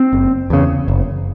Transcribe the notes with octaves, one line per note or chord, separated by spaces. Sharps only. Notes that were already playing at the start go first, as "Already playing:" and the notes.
Already playing: C4
F#1
E2 C#3
F#1